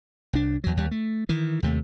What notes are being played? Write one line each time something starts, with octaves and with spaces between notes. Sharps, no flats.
C2 D4
E2 F#3
D#2 G3
A3
D#3 E3
D#2 C3 A3